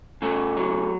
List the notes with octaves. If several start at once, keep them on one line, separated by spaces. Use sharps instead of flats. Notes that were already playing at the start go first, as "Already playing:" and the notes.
C#3 A3
F#3